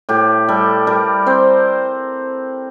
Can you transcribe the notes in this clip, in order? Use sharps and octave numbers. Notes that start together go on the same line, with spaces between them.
A2 G4
G3 A4
G3 A#4
C4 C5